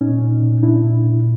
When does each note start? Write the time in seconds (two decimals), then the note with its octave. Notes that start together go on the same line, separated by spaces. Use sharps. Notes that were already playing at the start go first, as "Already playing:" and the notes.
0.01 A#2 C#4 D#4
0.22 A#2
0.42 A#2
0.63 A#2 D4 E4
0.84 A#2
1.04 A#2